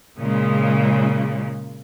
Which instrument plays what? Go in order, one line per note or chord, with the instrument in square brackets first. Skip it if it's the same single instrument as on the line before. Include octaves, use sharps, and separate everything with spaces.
[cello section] A#2 C#3 G#3